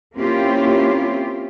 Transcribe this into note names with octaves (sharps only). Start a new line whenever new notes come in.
A#3 C4 C#4 E4 F4 G4